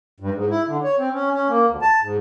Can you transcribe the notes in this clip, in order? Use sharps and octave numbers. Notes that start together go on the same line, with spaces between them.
G2
G#2
E4
D3
C#5
C4
C#4
C#4
A#3
D2
A5
G#2